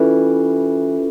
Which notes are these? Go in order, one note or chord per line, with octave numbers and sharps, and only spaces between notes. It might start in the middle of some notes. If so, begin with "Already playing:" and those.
Already playing: E3 G3 C#4 F4 A4